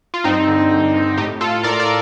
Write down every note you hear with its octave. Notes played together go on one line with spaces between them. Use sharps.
F4
G2 C4 D#4
D3
G2
D3
A2 D#4 G4
F4 A4
A2 A#4 D5
A#4 D5